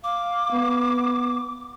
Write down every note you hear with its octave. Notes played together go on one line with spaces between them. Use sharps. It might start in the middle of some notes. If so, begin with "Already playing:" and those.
F5 D6
B3